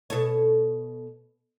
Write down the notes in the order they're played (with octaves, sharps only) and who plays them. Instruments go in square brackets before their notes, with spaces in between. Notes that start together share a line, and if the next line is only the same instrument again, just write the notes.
[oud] B2 A4 C#5